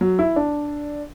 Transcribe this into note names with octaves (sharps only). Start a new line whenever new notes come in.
F#3
E4
D4